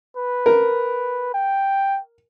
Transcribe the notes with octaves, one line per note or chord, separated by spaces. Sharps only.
B4
A#4
G5